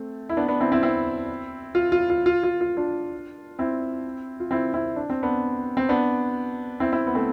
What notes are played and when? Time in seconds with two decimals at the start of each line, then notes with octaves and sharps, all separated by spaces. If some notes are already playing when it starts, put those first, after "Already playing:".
Already playing: A3 C4
0.29 E4
0.37 B3 D4
0.48 B3 D4
0.60 C4 E4
0.72 C4 E4
0.83 C4 E4
1.75 F4
1.92 F4
2.10 F4
2.26 F4
2.43 F4
2.61 F4
2.77 D4 F4
3.59 C4 E4
4.40 F4
4.51 C4 E4
4.74 C4 E4
4.96 D4
5.10 C4
5.23 B3 D4
5.77 C4
5.89 B3 D4
6.80 C4 E4
6.92 C4 E4
7.07 B3
7.15 A3 C4